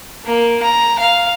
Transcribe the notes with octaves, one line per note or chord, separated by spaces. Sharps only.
A#3
A#5
F5